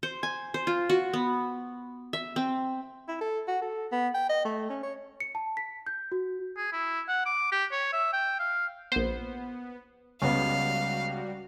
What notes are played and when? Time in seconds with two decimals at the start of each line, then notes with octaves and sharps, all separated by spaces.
0.03 C5
0.23 G#5
0.54 C5
0.67 F4
0.89 F#4
1.13 B3
2.13 E5
2.36 C4
3.08 E4
3.21 A4
3.48 F#4
3.62 A4
3.92 B3
4.15 G5
4.29 D#5
4.45 A3
4.70 C#4
4.83 C#5
5.20 C#7
5.35 A5
5.57 B6
5.87 G6
6.12 F#4
6.57 G#4
6.73 E4
7.09 F#5
7.26 D6
7.52 G4
7.72 C#5
7.93 E5
8.13 G5
8.39 F5
8.92 A#1 B3 C5
10.22 C#2 C#3 G3 B3 F#4 F5